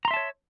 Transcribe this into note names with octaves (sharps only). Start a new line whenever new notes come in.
C#5 E5 A5 A#5 C6